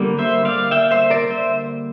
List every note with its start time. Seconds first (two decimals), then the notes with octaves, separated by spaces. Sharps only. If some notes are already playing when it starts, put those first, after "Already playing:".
Already playing: D3 G3 A#3
0.19 C5 E5
0.45 D5 F5
0.71 E5 G5
0.91 C5 E5
1.10 A#4 D5
1.30 C5 E5